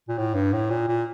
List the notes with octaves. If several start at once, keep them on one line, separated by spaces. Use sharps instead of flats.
A#2
A2
G2
A2
A#2
A#2